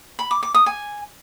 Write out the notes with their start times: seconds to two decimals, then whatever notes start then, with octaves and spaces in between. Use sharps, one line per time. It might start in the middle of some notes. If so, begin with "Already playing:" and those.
0.19 B5
0.31 D6
0.43 D6
0.54 D#6
0.66 G#5